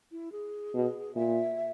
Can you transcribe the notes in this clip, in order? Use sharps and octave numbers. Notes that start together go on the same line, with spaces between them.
E4
G#4
B2
A#2 E5